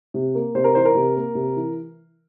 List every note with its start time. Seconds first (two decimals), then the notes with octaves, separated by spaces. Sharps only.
0.14 C3
0.35 A#3
0.55 C3 C5
0.64 A#4
0.75 E3 C5
0.85 A#4
0.95 C3
1.16 A#3
1.35 C3
1.56 E3